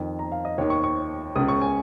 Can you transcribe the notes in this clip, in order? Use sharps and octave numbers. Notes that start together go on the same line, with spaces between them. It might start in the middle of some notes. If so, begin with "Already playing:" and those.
Already playing: F2 D#3
A#5
F5
D#5
D#2 D#3 C#5
C#6
C#6
C#2 C#3 D#6
C#6
G#5